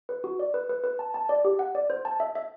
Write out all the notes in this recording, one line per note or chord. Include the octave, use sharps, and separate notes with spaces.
B4
F#4
D5
B4
B4
B4
A5
A5
D5
G4
F#5
D5
C5
A5
E5
E5